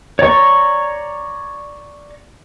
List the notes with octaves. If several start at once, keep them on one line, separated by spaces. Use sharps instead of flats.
C#5 D5 A#5 C#6